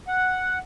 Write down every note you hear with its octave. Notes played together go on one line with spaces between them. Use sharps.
F#5